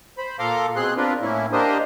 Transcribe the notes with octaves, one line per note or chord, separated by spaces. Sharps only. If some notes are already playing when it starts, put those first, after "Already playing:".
C5 B5
A#2 A4 F5 A#5 C6 D6
B2 C4 G#4 C6 F#6
C4 D4 F4 A#4 B4
A2 A#3 C#4 E4
A#3 D4 G4 A#4 C5 D#5